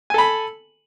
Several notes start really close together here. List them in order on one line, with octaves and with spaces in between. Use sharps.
G#5 A4 B5